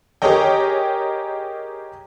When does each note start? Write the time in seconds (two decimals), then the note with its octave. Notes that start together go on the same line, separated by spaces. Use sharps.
0.22 G4 G#4 A#4 C#5 D#5 G5